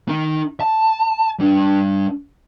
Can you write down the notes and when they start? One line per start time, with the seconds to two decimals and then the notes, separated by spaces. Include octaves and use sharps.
0.08 D#4 A#4
0.61 A5
1.39 G3 D4